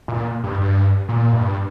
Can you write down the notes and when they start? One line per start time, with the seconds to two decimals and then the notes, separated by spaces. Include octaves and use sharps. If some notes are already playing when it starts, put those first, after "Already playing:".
0.08 A#2
0.44 G2
0.61 G2
1.09 A#2
1.33 G2